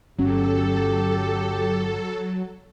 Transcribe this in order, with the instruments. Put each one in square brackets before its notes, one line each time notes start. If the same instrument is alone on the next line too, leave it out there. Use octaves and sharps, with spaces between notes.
[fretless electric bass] G1 C#4 [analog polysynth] F#3 [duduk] G4 [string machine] A4